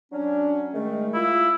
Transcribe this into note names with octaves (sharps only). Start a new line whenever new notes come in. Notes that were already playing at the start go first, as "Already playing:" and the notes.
F#3 C#4 D4
D#3 G#3 A3
E4 F4